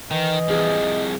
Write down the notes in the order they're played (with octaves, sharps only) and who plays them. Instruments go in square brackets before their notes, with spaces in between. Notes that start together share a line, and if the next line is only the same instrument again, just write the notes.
[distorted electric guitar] D#3 [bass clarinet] E3 [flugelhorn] D#5
[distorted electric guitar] C2 F3 [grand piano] G#4